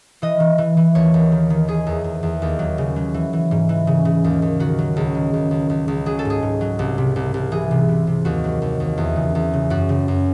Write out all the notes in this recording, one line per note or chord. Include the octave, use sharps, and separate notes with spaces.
E3 D#5
E3
E3
E3
D#2 C#5
D#2
D#3
D#3
D#3 G#4
E2
E2
E2
D#2
F#3
C#3
F#3
E3
E3
G#2
E3
C#3
C#3
D#2
D#2
D#3 F#4
F#3
C#2
D#3
C#2
C#2
C#2
C#2
F#3 G#4
A4
G#2 G#4
G#2
F#3
C2
C3
C2
C2
E3 G#4
C3
C3
C3
D#2 F#4
F#3
D#2
D#2
E2
C#3
E2
C#3
F#2 F#4
C#3
F#2